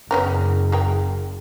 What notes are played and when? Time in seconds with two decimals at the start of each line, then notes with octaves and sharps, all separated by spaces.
0.11 F#1 B3 C#4 A#4
0.72 G#4 A#4 G5